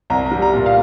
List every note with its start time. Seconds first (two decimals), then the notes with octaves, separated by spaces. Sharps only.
0.10 C2 A#5
0.26 A#5
0.32 G3
0.42 A#5
0.54 A#2
0.66 F5